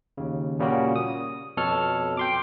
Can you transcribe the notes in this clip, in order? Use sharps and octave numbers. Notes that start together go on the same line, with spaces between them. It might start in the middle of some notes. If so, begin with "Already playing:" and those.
D#2 C#3
A#2 C#3 G3 A#3 C#4 F#4
D#6
F2 B2 A4 C#5 F6
G5 C6 D6